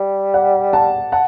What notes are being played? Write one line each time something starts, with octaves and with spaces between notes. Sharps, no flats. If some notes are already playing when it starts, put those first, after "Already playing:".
Already playing: G3
D5 F#5
F#5 A5
F#5 A5